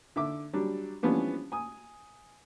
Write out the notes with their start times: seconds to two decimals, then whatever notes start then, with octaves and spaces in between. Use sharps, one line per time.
0.16 D3 E5 D6
0.53 F#3 G3 D4
1.03 E3 F3 G3 B3 C#4 D4
1.52 G#5 D#6